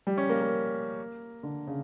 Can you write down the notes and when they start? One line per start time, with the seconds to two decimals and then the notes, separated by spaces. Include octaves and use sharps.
0.07 G3
0.17 C#4
0.30 A#3
0.41 A#3
1.43 D3
1.67 C#3